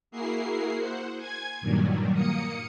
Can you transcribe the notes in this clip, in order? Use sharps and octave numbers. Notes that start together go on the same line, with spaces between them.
A#3 E4 F#4 G#4 A#4 C7
C5 F#5
G#5 G#6
G2 A#2 D#3 F#3 G3
A#3 D#6 C#7